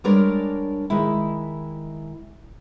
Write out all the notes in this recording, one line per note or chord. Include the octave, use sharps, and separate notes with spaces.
G3 G#3 D4 A#4 C#5 D5
D#3 G#3 E4